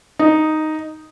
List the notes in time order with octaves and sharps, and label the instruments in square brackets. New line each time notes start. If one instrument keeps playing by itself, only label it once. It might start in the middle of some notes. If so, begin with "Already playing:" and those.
[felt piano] D#4